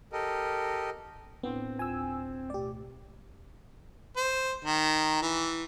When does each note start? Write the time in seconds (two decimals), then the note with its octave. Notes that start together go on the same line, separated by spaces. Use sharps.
0.12 G4 A4 A#4 D#5
1.43 A2 B3 C4 D4 E4
1.79 D2 F4 G#5 E6
2.50 B2 A3 G4 D5
4.16 C5
4.64 D#3
5.22 E3